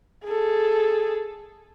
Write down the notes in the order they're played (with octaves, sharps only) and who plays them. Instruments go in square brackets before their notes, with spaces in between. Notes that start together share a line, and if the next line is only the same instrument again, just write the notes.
[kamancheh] G#4 A4